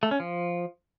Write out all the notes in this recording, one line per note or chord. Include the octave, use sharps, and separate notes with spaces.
A3
C#4
F3